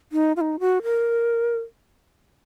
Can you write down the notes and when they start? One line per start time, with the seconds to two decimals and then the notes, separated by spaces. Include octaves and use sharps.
0.12 D#4
0.36 F4
0.41 D#4
0.60 F#4
0.83 A#4